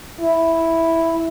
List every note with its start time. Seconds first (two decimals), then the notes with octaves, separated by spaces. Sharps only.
0.21 E4